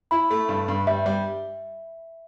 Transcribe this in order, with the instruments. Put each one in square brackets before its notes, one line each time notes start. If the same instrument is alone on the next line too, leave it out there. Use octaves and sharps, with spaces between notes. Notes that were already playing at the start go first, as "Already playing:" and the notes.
[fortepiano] E4 [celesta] B5
[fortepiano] A3
G2
G2
[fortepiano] G3 [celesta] E5
[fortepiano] G3